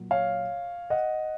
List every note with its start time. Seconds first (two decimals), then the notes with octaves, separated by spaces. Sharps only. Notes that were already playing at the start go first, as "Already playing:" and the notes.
Already playing: A#2 F#3
0.11 C#5 F5
0.90 D#5 F#5